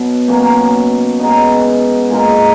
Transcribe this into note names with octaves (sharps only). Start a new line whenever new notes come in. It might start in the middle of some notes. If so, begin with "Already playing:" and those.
Already playing: B2 F#3 B3 F#4
B2 F#3 A#3 C#4
G#3 B3 D#4
A#2 G#3 D#4 A#4